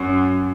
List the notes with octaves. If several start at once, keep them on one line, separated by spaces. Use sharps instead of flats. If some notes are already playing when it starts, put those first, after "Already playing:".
Already playing: F#2